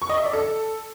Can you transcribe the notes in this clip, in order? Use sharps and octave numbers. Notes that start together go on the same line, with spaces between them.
C#6
D#5
E5
D5
A4